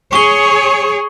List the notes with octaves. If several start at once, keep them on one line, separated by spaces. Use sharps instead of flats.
G#4 C#5 C#6 G7